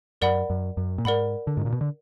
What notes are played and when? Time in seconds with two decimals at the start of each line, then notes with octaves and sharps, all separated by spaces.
0.22 F#2 A#4 D5 F#5 B5
0.50 F#2
0.77 F#2
0.98 A#2
1.05 G#2 A#4 D5 F#5 B5
1.47 D3
1.57 G#2
1.65 A#2
1.73 B2
1.81 D3